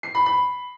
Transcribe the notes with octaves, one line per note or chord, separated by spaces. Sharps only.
C7
B5
B5